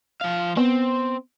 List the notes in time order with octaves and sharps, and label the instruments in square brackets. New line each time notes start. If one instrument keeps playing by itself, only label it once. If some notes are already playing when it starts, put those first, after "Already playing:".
[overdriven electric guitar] F3 F5
[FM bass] B3 [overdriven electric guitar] C4